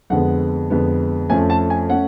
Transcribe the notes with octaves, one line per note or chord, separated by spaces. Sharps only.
F2 D3 G#3 B3 F#5
F2 D3 G#3 B3
F2 F3 A3 C#4 G#5
A5
G#5
A3 C#4 F#5